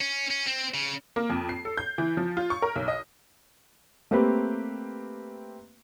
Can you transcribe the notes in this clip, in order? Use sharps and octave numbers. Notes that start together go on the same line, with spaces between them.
C#4
C#4
C4
C#3
A#3
F2
C7
A4
G6
E3
F3
F4
C#6
A#4
B1
D#5
A3 A#3 C4 G4 B4